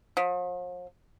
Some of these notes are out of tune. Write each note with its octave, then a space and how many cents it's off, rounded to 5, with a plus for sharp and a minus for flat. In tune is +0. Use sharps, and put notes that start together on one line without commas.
F3 +45